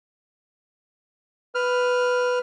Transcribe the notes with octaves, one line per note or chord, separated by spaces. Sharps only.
B4 F6